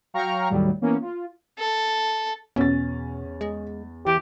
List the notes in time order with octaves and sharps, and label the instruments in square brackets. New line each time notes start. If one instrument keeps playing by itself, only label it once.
[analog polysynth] F#3 F5 G5 A#5 C#6 F6
D#2 A2 F#3 G3
E3 A#3 B3 C#4
F4
[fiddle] A4
[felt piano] E2 A6 [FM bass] B2 [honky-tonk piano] C#4
[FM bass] G#3
[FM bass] E3 [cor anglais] G4